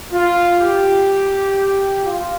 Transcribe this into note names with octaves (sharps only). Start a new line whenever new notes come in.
F4
G4
F4